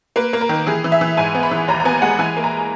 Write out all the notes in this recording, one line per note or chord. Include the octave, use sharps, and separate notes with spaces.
A#3 B4
A#3
A#4
D#3
E3 G#4
E3
E5
E3
G#2 G#5
B3
B5
E3
D#2 A#5
A#5
B3 G#5
G#3 F#5
E3 G#5
A#3
A#5